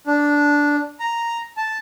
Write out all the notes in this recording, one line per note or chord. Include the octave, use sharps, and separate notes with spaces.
D4
A#5
A5